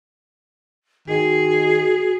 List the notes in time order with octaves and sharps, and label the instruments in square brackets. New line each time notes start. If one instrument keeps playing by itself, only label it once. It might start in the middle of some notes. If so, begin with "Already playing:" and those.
[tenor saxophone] D#3 [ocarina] F#4 [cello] G#4